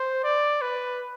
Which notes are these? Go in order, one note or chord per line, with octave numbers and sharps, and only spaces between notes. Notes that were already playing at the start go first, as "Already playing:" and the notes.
Already playing: C5
D5
B4